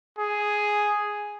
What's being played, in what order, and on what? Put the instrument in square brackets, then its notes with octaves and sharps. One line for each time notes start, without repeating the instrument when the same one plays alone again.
[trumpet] G#4